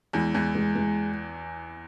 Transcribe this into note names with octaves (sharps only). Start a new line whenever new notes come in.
E2 E3 G#3
E2 E3 G#3
G#3
G#3